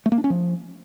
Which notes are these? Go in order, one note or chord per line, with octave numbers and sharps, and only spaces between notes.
A3
A#3
D4
C#4
F3